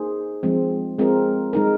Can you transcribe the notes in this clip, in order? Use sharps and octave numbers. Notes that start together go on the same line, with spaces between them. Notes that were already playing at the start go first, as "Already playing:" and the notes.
Already playing: A#3 D#4 G#4 C5
F3 G#3 C4
G#3 C4 F4 A#4
G#3 D#4 A#4